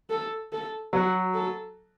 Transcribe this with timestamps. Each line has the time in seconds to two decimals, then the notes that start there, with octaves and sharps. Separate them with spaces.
0.10 A4
0.52 A4
0.93 F#3 F#4
1.34 A4